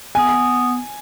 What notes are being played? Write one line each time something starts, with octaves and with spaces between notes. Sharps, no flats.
B3 G#5